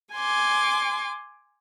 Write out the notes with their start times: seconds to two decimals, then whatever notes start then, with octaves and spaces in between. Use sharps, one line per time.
0.14 G#5 C6 D6